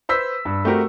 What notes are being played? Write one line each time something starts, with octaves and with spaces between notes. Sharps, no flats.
B4 C5 E6 B6
G2
A3 C4 F#4 G4 A#4